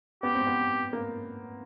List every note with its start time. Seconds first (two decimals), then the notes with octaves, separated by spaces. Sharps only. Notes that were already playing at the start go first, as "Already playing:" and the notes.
0.23 B3 G4
0.35 C4
0.47 B3
0.93 A#3